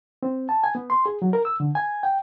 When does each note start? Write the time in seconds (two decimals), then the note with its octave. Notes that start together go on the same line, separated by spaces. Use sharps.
0.23 C4
0.49 A5
0.64 G#5
0.75 B3
0.90 C6
1.06 G#4
1.22 F#3
1.33 A#4
1.45 E6
1.60 D3
1.75 G#5
2.03 G5